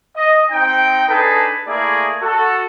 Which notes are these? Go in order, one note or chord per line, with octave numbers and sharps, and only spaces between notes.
D#5
C4 D#4 G5
D4 D#4 G#4 A4 B4
A3 A#3 E4 G#4 D5
F#4 A4